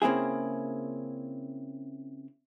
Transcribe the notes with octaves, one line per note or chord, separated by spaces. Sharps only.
C#3 A#3 C4 E4 G#4